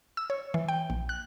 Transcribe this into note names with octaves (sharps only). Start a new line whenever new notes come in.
E6
C#5
E3
G5
A#1
F#6